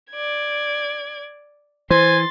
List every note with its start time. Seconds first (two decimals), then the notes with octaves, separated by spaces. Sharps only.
0.11 D5 G#6
1.90 E3 C5 G#5 C6 A6